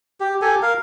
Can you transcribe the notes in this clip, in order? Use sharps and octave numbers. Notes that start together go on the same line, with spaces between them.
G4
G4 A4 G#5
A#4 F5